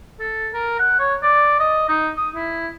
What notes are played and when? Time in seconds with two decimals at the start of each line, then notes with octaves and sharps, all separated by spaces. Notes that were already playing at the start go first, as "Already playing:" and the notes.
0.20 A4
0.53 A#4
0.79 F#5
0.99 C#5
1.23 D5
1.60 D#5
1.89 D#4
2.17 D#6
2.35 E4